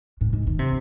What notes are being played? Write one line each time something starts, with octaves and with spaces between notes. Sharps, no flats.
G#2
G#2
D#3
C3